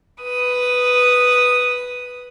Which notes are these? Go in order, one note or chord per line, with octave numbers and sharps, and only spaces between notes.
B4 D#6